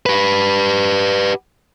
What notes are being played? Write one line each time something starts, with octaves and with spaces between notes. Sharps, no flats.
G4 B4